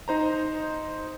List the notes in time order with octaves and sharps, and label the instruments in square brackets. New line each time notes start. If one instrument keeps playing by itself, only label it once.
[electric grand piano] D#4 C5 A#5